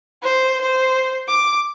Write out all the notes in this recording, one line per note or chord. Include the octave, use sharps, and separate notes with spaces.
C5
C5
D6